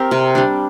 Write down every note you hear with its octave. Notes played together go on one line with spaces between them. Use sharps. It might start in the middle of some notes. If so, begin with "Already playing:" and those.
Already playing: C4 G4 A#4
C3
G3 D4